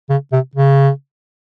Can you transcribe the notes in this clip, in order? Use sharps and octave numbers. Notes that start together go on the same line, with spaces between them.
C#3
C3
C#3